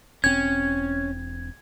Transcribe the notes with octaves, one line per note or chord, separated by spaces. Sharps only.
E1 C4 C#4 G#6